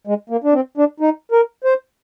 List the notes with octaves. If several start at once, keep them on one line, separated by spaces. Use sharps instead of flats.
G#3
A#3
D4
C4
D4
D#4
A#4
C5